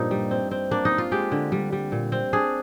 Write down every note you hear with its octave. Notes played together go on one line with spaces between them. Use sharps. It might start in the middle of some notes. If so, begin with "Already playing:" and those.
Already playing: G2 A#2 F3 A#3 D#4
G3
C4
C4
A#3 D4
D#4
D4
F4
G#3 G4
D3
G3
G3
A#2
C4
D4 G#4